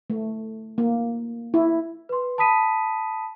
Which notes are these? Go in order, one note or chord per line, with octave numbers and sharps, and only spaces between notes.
A3
A#3
E4
B4 C6
A5 B5 D#6 B6 D#7